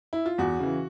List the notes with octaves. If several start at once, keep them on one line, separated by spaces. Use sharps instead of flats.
E4
F4
E2 F#4
C#3 E3